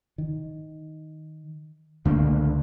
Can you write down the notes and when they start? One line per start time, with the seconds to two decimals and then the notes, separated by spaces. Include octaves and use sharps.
0.18 D#3
2.05 C#2 D3 A3 A#3